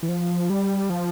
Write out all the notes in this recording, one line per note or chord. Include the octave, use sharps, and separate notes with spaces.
E3
F3
G3
F3